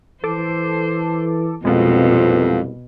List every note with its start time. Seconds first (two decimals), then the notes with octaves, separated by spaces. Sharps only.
0.24 E3 A4 C5 D6
1.65 C2 F2 B2 G#3 B3 F4